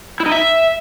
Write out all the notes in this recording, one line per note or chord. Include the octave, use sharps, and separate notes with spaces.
E4
D#4
E5